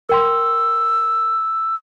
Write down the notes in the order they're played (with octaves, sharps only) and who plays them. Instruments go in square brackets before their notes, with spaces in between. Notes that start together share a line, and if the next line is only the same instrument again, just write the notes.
[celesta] A#4 G5 C6 [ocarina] E6